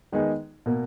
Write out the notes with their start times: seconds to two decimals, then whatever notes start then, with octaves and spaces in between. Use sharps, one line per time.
0.12 D#3 G#3 B3 D#4 G#4
0.66 B2 A#3